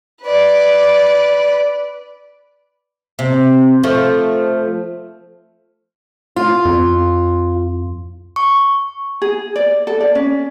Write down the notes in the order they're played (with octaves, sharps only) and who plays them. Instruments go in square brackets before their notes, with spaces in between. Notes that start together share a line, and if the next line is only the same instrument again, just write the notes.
[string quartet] B4 D5
[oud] C3
F3 A3
[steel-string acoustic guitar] F4
[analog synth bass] F2
[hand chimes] C#6
[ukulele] G#4
D5
A4
D5
C#4